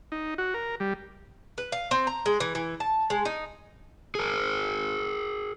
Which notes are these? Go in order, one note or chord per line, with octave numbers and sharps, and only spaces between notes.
D#4
F#4
A#4
G3
B4
F5
C4
A#5
G#3
E3
E3
A5
G#3
D#4
G#4 A#4